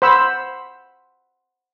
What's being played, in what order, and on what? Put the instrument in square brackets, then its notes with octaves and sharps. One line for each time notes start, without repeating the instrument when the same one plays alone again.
[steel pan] C5 F#5 B5 E6